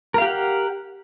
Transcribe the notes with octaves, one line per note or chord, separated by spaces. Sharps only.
G4 A#4 F5 F#5